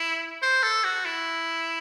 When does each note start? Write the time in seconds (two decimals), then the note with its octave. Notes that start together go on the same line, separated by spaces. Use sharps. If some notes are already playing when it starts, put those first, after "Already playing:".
Already playing: E4
0.42 C5
0.63 A4
0.84 F#4
1.05 E4